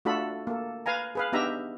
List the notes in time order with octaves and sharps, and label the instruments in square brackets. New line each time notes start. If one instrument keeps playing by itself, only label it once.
[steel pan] A3 D4 F4 F#4 A4 B5
A#3 A4
B4 F5 G#5 A#5
G#4 B4 F5
B3 D4 D#4 G4 E5 A#5